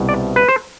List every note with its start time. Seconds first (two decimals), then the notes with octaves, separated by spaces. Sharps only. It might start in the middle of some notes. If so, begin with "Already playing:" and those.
Already playing: C2 B2
0.09 D5
0.36 B4
0.48 C5